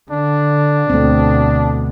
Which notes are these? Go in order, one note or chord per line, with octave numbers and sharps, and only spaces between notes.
D3 D4
D2 B2 A3 C4